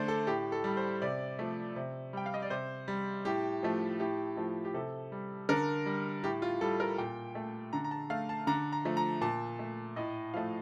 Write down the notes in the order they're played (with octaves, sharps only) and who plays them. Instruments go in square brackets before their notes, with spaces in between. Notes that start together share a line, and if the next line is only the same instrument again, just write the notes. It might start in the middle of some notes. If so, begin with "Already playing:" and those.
Already playing: [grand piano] D3 A3 C5 D5
A4
A2 G4
A4
G3
C5
C3 D5
F3 A3
C3
G3 G5
F5
D#5
D5
C3 C5
G3
A2 G4
F3 A3
A2 G4
F3 A3
G4
C3 A4
G3
D3 A#4
G3
A2 G4
F4
G3 A4
A#4
A#2 G5
A3
D3 A#5
A#5
A5
A3 F5
A5
D3 A#5
A#5
F3 A3
A#5
A#2 A5
A3
A2 D#5
F3 A3 F5